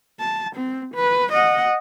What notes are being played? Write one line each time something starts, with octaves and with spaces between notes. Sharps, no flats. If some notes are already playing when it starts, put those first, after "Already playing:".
A5
C4
B4
D#5 F#5